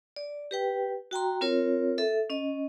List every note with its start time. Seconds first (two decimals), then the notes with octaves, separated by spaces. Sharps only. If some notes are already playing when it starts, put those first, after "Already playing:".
0.16 D5
0.51 G4 B4 G5
1.11 F#4 G5 A#5 C6
1.41 C4 F4 A#4 C#5
1.98 A4 E5
2.30 C#4 D#5